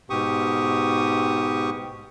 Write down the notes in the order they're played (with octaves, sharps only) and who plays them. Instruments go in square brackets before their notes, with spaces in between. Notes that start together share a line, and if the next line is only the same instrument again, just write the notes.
[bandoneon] G#2 B2 G4 C#6 D#6